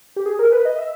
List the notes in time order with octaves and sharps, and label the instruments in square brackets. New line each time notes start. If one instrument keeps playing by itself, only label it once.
[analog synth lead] G4
G#4
A#4
B4
D#5
E5